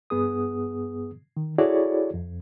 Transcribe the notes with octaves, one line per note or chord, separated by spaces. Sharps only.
G2 B3 G#4 D#6
D#3
E4 F#4 G#4 A4 C#5 D5
F2